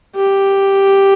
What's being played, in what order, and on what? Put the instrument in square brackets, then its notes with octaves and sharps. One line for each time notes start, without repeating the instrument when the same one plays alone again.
[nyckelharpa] G4